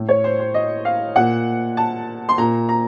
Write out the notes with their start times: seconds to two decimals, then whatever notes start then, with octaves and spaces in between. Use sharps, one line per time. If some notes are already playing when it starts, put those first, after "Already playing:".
Already playing: A2
0.09 C#5
0.24 C5
0.39 C5
0.54 D#5
0.85 F5
1.16 A#2 F#5
1.77 A5
2.29 C6
2.38 A#2 A#5
2.69 A#5